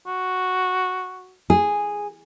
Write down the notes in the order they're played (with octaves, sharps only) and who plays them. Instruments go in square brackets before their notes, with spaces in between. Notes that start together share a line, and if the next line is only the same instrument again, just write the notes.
[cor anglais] F#4
[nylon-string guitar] G#4